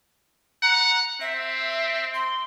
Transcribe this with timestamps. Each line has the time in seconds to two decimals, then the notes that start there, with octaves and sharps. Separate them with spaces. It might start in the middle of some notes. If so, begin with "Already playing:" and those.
0.63 F#5 A#5
1.21 C4 E5
2.14 C6